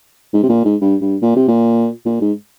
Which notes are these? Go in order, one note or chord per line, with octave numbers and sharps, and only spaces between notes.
G#2
C3
A#2
G#2
G2
G2
A#2
C3
A#2
A#2
G#2